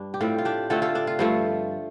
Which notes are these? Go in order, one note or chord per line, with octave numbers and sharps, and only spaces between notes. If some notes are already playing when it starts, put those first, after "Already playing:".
Already playing: G2 D4
G4
A2 G3 C4 F4
F4
D4 G4
D3 A3 C4 F4 A4
F4 A4
D4
F4
G2 F3 A3